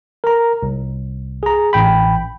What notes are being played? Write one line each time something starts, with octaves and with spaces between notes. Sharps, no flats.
A#4 A#5
C2
G#4 A#5
A1 G5 B5